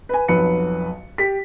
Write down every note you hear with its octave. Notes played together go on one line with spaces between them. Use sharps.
B4 G#5
B1 F2 F#3 B4 C#7
G4 B6